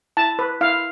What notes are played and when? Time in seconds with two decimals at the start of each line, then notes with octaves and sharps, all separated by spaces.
0.17 E4 A5
0.39 B4
0.61 E4 F5